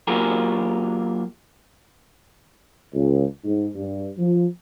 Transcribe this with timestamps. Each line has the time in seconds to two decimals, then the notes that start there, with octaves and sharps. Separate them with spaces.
0.07 F#3 A#3 F4 G4 G#4 A#4
2.94 C#2
3.45 G#2
3.75 G2
4.18 F3